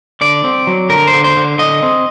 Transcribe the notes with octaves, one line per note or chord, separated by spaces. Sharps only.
D3 D5
C4
F#3
D3 A#4
C5
D3
C5
D3
D3 D#5
C4